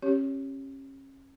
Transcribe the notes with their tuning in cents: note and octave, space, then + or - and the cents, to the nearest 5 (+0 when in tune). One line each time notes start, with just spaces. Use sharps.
C#4 -35 G4 +0 C#5 +10